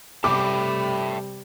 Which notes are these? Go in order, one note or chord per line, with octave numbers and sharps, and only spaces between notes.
C3 G3 A4 E5 G5 B5 D6